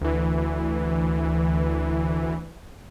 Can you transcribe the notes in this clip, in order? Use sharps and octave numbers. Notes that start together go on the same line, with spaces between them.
D2 E3